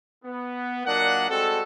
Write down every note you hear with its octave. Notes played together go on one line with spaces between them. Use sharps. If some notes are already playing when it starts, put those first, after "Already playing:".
B3
A#2 F#3 A#3 D4 D#5 F#5
G3 G#3 C4 F#4 G4 A4